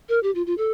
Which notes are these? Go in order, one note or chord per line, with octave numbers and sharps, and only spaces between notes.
A#4
G4
F4
F4
A4